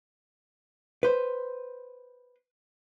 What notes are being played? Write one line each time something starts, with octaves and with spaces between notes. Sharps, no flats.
B4 C5